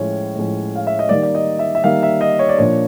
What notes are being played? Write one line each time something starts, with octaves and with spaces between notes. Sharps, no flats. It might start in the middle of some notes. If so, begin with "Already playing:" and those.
Already playing: A2 F3 G#3 C#4 C#5
A2 F3 G#3 C#4
F5
E5
D#5
D#3 G3 A#3 D5
D5
D#5
E5
E5
D#3 G3 A#3 F5
E5
D#5
C#5
D5
A#2 F3 A#3 D4 C#5